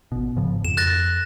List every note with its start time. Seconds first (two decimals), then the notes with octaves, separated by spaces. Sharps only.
0.12 G#1 B2
0.36 G#2 C#3 F3
0.65 F2 E7
0.77 F#6 A6 A#6